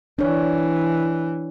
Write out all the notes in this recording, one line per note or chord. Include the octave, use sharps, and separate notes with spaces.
E3 D4 C#5